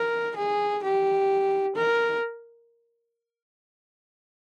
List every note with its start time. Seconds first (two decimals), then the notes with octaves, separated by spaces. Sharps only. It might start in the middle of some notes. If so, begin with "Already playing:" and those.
Already playing: A#4
0.37 G#4
0.82 G4
1.76 A#4